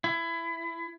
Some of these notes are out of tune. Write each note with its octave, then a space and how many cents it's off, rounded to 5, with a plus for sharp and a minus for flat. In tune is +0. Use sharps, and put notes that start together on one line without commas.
E4 +20